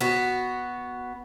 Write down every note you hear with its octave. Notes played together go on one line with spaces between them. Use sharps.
B3 F#4